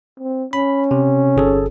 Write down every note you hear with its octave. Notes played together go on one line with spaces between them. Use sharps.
C4
C#4 B5
C3
G1 G#4 A4